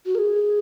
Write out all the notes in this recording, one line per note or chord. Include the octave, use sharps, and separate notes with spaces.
F#4
A#4
G#4